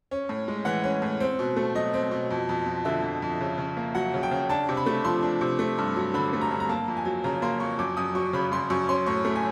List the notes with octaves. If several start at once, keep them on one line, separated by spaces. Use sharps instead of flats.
C#4
A2
G#3
E3 F#5
C#4
A2
C4
B2
A3
F#3 D#5
C4
B2
F2
F2
F3
D3 E5
F2
F2
C#3
C#3
A#3
F#3 F#5
C#3
G5
C#3
D4 A5
C3
B5
A3
F3 C6
D4
C3
A3
G2
F#3
D3 B5
A3
A#5
G2
A#5
A#3 A5
F2
G#5
F#3
C#3 A#5
A#3 C6
F2 C#6
F#2 D6
F#2 D#6
F#3 C#6
C#3 B5
F#2 C6
F#2 C#6
C#4 C6
A2 C#6
A3
G#5